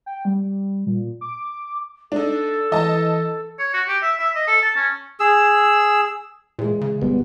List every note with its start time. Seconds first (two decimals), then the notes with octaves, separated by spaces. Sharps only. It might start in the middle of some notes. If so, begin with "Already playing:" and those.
0.06 G5
0.25 G3
0.86 A#2
1.21 D6
2.12 D4 D#4 A4
2.72 E3 D#5 A5
3.59 C#5
3.74 F#4
3.89 G4
4.03 E5
4.20 E5
4.36 D#5
4.48 A4
4.63 A5
4.77 C#4
5.20 G#4 E6
6.59 A#2 E3 G#3
6.81 C#3
7.02 G1 B2 G3 B3